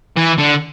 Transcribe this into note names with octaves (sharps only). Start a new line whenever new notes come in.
E3
D3